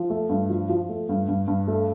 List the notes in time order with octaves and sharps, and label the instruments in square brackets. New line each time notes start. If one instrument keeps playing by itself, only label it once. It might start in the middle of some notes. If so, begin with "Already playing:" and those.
Already playing: [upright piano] F3
A3
G2
F3
F3
A3
G2
G2
G2
A3